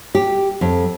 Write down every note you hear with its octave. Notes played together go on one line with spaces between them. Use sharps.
G4
F2